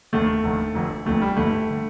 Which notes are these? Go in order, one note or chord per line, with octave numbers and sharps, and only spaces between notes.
F1 D#2 D3 A3
F1 D#2 D3
F1 F2 D3
F1 F2 D3 A3
G3
G1 F2 D3 A3
D3